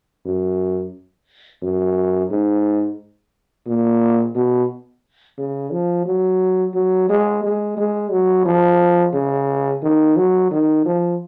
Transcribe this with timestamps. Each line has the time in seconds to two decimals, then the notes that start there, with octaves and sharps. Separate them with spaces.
0.25 F#2
1.62 F#2
2.31 G#2
3.67 A#2
4.35 B2
5.39 C#3
5.72 F3
6.06 F#3
6.74 F#3
7.09 G#3
7.44 G#3
7.77 G#3
8.11 F#3
8.46 F3
9.14 C#3
9.83 D#3
10.17 F#3
10.51 D#3
10.85 F3